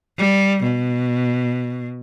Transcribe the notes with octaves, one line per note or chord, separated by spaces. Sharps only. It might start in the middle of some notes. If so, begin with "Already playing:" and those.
G3
B2